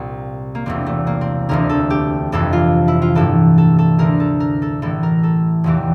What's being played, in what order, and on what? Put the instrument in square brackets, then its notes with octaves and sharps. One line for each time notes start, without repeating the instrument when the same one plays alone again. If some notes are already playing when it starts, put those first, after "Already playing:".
Already playing: [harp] C2 A#2 A#3
A#3
E1 E2 C3 C4
A3
A#3
C4
E1 D2 D3 A#4
A4
G4
G1 F2 C3 E3 A4
F4
E4
F4
A1 G2 E3 A4
A4
A4
D2 D3 A#4
A4
A#4
A4
A1 A2 E3 A4
A#4
A4
F1 E2 C3 E3 G4